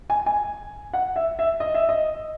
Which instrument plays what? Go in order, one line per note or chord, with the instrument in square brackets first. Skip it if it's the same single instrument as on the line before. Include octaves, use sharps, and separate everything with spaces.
[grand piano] G#5
G#5
F#5
E5
E5
D#5
E5
D#5